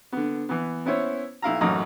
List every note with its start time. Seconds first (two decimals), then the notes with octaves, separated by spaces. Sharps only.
0.12 D3 B3
0.49 E3 B3
0.86 B3 C#4 E4 C5 C#5
1.42 B1 E4 F5 A#5
1.61 A1 F#2 D#4 F#4 A#5 D#6